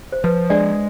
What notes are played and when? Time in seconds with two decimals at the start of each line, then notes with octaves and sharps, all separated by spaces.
0.12 C5
0.24 F3 B4
0.50 G#3 D4 D5